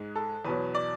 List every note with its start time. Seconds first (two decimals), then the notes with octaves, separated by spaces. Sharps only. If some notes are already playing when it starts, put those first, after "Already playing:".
Already playing: G#2 G#3
0.16 A4
0.45 E2 B2 F#3 B4
0.75 D5